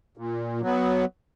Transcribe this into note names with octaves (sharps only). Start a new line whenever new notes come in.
A#2
F#3 B3